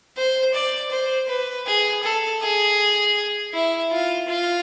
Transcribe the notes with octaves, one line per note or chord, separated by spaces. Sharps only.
C5
D5
C5
B4
G#4
A4
G#4
E4
F4
F4